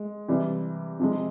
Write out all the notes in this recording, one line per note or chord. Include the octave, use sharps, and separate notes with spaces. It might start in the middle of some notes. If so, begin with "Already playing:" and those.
Already playing: G#3
C3 E3 G3
C3 F3 G#3